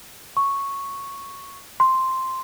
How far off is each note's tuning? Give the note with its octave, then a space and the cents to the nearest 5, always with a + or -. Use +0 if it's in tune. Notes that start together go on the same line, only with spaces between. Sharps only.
C#6 -5
C6 +0